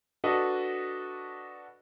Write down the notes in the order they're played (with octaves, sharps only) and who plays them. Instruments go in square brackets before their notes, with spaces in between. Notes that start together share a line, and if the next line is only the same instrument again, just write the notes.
[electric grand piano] D4 F#4 A4 B4 D#5